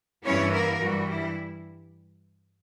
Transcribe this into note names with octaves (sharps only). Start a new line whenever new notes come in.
G2 E3 B3 C#4 E4 C#5
A#3 A#4
G2 E3 G3 F#4
E4